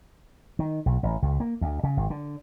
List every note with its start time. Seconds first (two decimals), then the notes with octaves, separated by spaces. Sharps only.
0.59 D#3
0.86 B1
1.03 A1
1.22 C#2
1.40 A#3
1.61 D2
1.84 C#3
1.97 G#1
2.10 D3